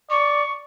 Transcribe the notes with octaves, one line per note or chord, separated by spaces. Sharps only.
D5 C#6